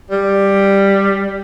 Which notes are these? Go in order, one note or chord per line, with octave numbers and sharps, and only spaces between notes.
G3